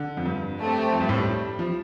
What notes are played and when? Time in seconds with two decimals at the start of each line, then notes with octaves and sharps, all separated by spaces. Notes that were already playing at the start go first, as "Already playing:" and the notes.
Already playing: D3
0.17 F2
0.26 G2
0.59 A3 C4 G4
0.93 F2
1.01 G2
1.09 A2
1.18 G3
1.59 F3